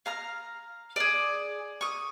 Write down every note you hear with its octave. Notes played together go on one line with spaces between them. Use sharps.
F5 A#5 F6
G#4 D5
C#6 D#6